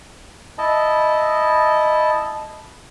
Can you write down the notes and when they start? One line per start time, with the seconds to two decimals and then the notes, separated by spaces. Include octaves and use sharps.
0.58 E4 D#5 A5